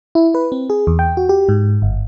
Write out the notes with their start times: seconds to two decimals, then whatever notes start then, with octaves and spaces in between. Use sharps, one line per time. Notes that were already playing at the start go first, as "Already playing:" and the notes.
0.15 E4
0.35 B4
0.52 C4
0.70 G#4
0.87 E2
0.99 G5
1.17 F#4
1.29 G4
1.49 G#2
1.82 G1